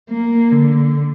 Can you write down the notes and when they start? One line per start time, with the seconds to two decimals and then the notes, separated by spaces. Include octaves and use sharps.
0.10 A#3
0.52 D3